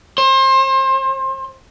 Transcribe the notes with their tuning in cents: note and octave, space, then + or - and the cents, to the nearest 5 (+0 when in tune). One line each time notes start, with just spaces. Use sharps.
C5 +30